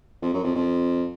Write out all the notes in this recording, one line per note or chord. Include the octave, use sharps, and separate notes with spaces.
F2
F#2
F2
F2